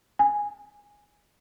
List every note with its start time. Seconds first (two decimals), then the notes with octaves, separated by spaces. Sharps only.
0.19 G#5